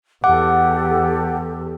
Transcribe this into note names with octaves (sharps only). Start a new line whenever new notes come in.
E2 G4 A4 F#5 D6